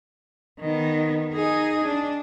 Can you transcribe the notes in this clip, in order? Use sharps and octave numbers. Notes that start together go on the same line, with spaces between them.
D#3 B3
D#4 G#4
D4